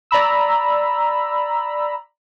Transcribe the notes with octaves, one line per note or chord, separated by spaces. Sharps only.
D5 A#5 B5 E6